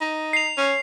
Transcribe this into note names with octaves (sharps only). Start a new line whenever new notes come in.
D#4
C7 F7
C#4